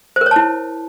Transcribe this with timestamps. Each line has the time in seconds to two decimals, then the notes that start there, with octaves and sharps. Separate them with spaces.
0.16 C5
0.21 A#4
0.26 C#5
0.31 A5
0.36 E4